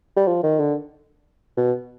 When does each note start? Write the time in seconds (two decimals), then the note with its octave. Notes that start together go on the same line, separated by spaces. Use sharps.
0.16 G3
0.27 F3
0.43 D#3
0.59 D3
1.57 B2